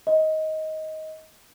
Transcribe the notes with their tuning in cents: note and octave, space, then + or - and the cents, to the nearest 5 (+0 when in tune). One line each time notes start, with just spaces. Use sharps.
D#5 +15